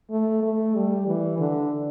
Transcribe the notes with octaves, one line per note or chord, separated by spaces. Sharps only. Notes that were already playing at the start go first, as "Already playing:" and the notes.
A3
A3
G3
E3
D3